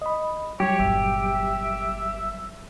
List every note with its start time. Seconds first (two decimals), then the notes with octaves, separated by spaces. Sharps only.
0.02 D#5 B5
0.60 F#3 G3 G4 C#5
0.79 G1 A#2 E5